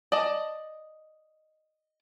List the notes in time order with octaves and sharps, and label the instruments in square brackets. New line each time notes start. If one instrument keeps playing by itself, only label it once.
[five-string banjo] D5 D#5 A5